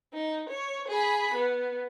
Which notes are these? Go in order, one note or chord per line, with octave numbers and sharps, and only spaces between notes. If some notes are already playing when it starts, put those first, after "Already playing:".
D#4
C#5
G#4 B5
B3